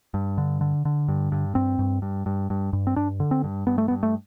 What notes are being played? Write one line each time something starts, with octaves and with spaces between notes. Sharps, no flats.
G2
D3
D3
D3
G2
G2
G2 C4
G2
G2
G2
G2
G2
C4
G2 D4
D3
C4
G2
G2 B3
A3
G2 B3
A3